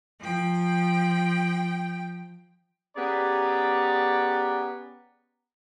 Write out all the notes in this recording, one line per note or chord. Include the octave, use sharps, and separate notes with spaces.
F3 G5
B3 C#4 G4 G#4 D5 A#5